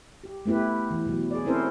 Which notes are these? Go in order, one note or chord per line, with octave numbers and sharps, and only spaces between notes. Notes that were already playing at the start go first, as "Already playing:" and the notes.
G4
A3 B3 E4 G4 B4
E3
B2 E3 F#3
G#4 D5
C4 C#4 E4 A4 A#4 C5